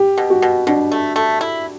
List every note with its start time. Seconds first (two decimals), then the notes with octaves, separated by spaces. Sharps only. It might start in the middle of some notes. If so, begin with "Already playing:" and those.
Already playing: G4
0.18 B2
0.30 F#4
0.42 B2
0.67 B2 D4
0.92 A3
1.16 A3
1.41 E4